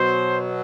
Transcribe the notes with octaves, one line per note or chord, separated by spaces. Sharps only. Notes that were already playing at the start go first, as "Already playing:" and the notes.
Already playing: B2 F#3 C5